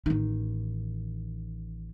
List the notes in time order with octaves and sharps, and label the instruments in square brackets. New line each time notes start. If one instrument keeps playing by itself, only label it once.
[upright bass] A1 D#3